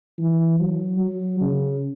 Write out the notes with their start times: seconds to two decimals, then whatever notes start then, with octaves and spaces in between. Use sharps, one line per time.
0.19 E3
0.60 F#3
0.99 F#3
1.41 C#3